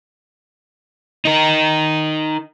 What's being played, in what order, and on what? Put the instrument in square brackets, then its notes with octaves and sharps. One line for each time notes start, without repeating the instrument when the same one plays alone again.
[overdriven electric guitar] D#4 A#4